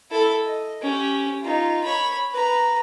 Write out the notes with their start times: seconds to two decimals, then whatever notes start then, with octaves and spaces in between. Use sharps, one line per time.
0.11 E4 A4
0.45 D#5
0.82 C#4 G4
1.42 D#4 F4
1.84 C#5 B5
2.31 B4 A#5